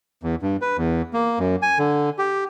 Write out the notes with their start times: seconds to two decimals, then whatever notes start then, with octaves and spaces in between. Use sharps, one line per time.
0.23 E2
0.42 G2
0.61 B4
0.77 E2
1.13 A#3
1.39 F#2
1.62 G#5
1.79 D3
2.18 G4